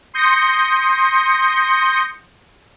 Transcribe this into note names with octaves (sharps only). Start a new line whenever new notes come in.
C6 D#6 G6 A#6 C#7